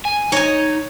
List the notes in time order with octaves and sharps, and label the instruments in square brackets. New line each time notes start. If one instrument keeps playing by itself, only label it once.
[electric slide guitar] G#5
[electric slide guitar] D#4 [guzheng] C#5 G#5